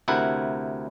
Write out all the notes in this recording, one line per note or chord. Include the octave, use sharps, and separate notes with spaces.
D2 C3 E4 A#4 F#5